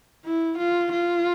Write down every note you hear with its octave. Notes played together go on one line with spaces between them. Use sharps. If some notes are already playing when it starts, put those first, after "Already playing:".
E4
F4
F4